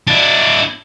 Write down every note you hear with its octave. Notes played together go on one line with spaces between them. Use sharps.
D4 E4